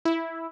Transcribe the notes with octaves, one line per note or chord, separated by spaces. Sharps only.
E4